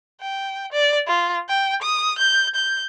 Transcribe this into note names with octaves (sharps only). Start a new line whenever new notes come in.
G5
D5
F4
G5
D#6
G6
G6